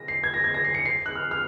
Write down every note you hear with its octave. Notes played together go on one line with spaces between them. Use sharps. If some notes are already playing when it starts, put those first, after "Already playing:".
Already playing: A#6
C7
G#6
A#6
G#6
A#6
C7
C#7
C7
F#6
F6
F6